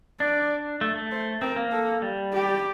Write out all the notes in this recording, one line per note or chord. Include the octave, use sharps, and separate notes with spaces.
D4 D5
A3
A3
C5
C4 A#4
A#3
A4
G3
G4